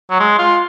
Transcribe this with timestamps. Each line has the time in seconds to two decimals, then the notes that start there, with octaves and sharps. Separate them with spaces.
0.10 F#3
0.20 G#3
0.39 F4